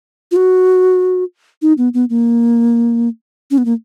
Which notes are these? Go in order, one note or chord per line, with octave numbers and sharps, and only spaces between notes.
F4
F#4
D#4
B3
B3
A#3
C#4
B3
A#3